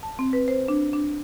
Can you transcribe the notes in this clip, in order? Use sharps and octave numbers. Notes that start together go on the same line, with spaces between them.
A5
C4
B4
C5
D4
D4